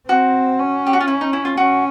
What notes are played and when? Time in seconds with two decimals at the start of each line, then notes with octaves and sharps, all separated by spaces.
0.09 C4 F#4
0.59 C#4
0.87 G4
0.93 F#4
1.00 F4
1.08 E4
1.21 D#4
1.33 E4
1.45 F4
1.57 C#4 F#4